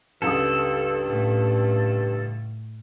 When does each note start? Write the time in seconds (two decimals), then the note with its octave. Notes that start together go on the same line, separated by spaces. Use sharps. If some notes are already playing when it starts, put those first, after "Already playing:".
0.22 C#2 G2 A4 D#6
1.07 A2